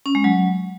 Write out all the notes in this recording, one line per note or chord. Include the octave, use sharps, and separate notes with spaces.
C#4
G#3
F#3